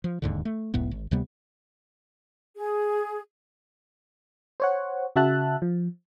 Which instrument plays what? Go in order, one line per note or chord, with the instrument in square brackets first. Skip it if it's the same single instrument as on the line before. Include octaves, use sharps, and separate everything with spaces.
[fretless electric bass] F3
D1 D#2 G#2 D3
A3
F1 C#2 A2 B3
G#1
D2 C3 G3 B3
[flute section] G#4
[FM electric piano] C5 C#5 F#5
C#3 F#4 E5 A5 F#6
F3